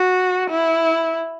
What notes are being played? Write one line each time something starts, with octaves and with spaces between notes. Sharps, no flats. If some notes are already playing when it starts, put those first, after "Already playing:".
Already playing: F#4
E4